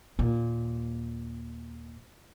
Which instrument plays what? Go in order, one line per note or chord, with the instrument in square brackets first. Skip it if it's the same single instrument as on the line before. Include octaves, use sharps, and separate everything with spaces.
[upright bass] D#2 A#2